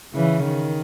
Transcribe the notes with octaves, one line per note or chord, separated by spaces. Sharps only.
C#3 E3
D#3